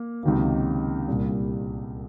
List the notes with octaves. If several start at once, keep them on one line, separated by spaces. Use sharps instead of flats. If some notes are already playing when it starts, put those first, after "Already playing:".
Already playing: A#3
C#2 C3 D#3 F#3 A#3
C2 A#2 G3